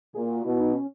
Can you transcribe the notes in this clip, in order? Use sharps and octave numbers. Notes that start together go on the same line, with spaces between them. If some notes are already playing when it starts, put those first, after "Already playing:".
A#2 G#4
F#4
B2 E4
D#4
C#4